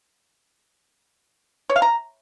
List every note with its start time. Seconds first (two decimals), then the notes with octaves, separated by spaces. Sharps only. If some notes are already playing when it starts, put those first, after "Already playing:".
1.70 C#5
1.76 F5
1.82 A#5